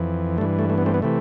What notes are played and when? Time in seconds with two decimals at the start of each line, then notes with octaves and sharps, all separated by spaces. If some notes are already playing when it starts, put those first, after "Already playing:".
Already playing: F2 E3
0.38 G2 E3 A3
0.59 A3
0.70 A3
0.78 B3
0.86 A3 C4
0.94 B3
1.02 C3 E3 A3